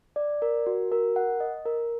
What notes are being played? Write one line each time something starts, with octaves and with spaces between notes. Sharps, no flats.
D5
A#4
F#4
A#4
F#5
D#5
A#4